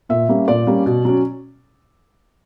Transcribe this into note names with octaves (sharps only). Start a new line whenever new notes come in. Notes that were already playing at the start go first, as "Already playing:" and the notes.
A#2 E5
G3 A#3 C#4
A#2 D5
G3 A#3 C#4
B2
F#3 C#4